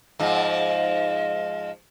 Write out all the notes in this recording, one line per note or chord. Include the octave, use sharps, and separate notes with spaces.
G#2 F3 D#5